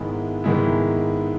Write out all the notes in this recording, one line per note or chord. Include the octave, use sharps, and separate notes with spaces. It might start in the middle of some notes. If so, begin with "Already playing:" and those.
Already playing: G#2 D#3 G#3 B3 E4
G#2 D#3 G#3 B3 E4